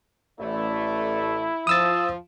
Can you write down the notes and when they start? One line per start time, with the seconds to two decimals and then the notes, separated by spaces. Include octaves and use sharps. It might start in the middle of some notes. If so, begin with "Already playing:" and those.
0.39 A1 A3 E4 D5
1.67 F3 D#6 E6 A6